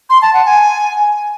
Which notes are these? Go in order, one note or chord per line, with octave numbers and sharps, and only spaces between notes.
C6
A5
F#5
G#5